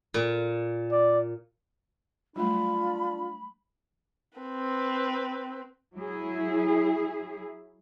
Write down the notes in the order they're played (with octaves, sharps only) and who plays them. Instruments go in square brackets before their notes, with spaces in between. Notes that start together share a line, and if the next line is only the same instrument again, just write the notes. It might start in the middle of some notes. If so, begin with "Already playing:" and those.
[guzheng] A#2
[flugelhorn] D5
[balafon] F#3 G3 A3 [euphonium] D4 [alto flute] F4 [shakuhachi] B5
[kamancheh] C4 B4
[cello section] F#3 E4 G#4